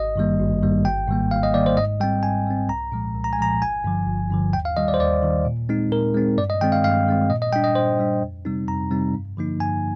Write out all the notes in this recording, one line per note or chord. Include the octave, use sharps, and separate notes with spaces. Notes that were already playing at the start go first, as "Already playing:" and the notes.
Already playing: G#1 D#5
G2 D#3 G3 A#3
G#1
G2 D#3 G3 A#3
G#1 G5
G#2 D#3 G3 A#3
G#1 F5
D#5
G#2 D#3 G3 A#3 D5
C5
G#2 D#5
G3 C4 G5
G#2 G#5
G3 C4
C2 A#5
A#2 F3 G#3
C2
A#5
G#5
A#2 F3 G#3 A#5
G1 G#5
G2 D3 F3
G1
G2 D3 F3
D#2 G5
F5
D#3 G3 D#5
D5
C5
D#2 D5
D#3 G3
A#2
G#3 C4 D#4
A#2 A#4
G#3 C4 D#4
G2 D5
D#5
D#3 G#3 C4 G5
F5
G2 F5
D#3 G#3 C4
A#2 D#5
D#5
G3 D4 G5
D#5
A#2 C5
G3 D4
F2
C3 G3 C4 D#4
F2 A#5
C3 G3 C4 D#4
G2
D3 F3 A#3 D#4
G2 G#5